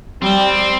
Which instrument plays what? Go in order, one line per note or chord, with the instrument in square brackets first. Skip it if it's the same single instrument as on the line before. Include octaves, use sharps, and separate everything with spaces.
[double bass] G3 [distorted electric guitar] C4